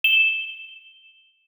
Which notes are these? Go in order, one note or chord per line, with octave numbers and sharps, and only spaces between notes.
E7 G7